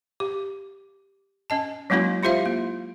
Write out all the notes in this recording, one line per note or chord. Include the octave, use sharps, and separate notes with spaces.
G4
C#4 D#5 A5
F#3 G#3 A#3 C#4 E4 F#4
E4 F4 G4 C5 E5 F5
A#3